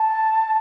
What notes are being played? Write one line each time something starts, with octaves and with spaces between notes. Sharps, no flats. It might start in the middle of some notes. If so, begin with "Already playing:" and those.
Already playing: A5